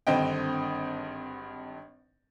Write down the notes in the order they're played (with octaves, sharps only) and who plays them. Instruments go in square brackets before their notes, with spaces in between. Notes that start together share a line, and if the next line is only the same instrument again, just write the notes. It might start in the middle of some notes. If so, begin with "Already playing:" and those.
[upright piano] G#1 G2 D3 C4 D#5 G5